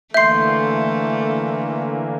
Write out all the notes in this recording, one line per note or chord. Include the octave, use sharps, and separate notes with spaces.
D3 E3 A3 A#3 E5 C6 G6 C7